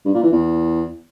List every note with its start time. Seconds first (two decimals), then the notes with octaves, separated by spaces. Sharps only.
0.05 G2
0.14 A#2
0.23 E3
0.32 E2